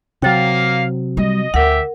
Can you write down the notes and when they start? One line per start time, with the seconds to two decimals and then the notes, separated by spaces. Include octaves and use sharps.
0.22 C3 F#3 A#3 F5 G5 A6
1.17 G3 D#5
1.54 D2 G4 A#4 E5 F#5